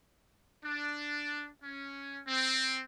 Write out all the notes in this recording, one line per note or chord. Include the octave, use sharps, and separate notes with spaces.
D4
C#4
C4